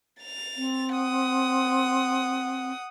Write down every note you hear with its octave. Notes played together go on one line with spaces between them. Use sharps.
A6 F7
C4
F#5 D#6